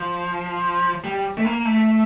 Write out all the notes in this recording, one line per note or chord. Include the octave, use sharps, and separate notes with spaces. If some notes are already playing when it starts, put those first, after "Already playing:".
Already playing: F3
G3
A3
A#3
A3